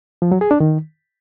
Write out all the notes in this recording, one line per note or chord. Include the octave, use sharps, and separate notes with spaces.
F3
F#3
G#4
D4
D#3